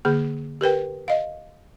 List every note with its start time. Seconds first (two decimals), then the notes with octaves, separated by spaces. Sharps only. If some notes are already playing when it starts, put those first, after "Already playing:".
0.05 D3 A#3 G#4
0.61 G4 A#4 B4 G5
1.08 D#5 F5